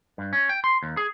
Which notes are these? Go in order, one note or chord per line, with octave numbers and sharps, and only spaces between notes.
G2
C#4
G5
C6
D#2
G#4